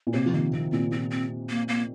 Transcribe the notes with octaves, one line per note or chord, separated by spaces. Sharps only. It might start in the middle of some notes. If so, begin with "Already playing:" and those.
A#2
C3 A#3
F3
D#3 A#3
D#3 C4
A#2 C4
A#2 C4
C4
A#3
A#3